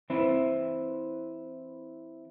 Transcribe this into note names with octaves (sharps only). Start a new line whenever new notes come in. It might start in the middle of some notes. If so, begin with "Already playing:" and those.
E3 C4 E4 B4